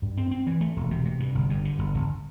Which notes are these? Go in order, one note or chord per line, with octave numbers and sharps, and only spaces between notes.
G2
C4
C4
E3
A3
E1
C3
C3
G2
G1
G2
D3
G1
G1